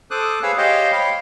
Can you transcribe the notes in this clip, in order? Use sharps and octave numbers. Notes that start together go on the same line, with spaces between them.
A4 C5 D6 D#6 F#6
G#4 B4 C#5 F5 G#5 E6
G4 C5 C#5 D#5 F5 G5
C#5 F5 G5 B5